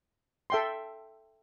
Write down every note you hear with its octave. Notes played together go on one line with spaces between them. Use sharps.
A4 E5 G5 C6